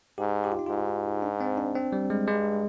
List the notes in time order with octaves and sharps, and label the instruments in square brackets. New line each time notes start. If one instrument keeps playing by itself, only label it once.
[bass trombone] G#2 [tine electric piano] G4
[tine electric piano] G4
F4
D#4
[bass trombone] G#2 [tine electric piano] F4
[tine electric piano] D4
C4
D4
C4
G3
G#3
[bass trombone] G2 [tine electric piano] G#3